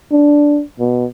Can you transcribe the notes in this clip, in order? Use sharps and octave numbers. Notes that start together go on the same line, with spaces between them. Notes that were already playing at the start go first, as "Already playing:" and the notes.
D4
B2